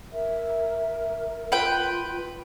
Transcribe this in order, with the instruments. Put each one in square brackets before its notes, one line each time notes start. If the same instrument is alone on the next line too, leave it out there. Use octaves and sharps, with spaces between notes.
[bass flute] A#4 [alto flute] E5
[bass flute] F4 [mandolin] B4 G5